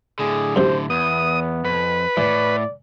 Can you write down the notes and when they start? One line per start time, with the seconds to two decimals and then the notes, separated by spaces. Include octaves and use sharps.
0.19 A2 D3 G#4
0.56 F#2 C3 C5
0.90 E2 B3 D#6
1.65 F2 B4
2.17 A2 E3 D5